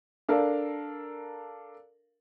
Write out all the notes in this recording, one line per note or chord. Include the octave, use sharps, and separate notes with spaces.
D4 A4 A#4 F5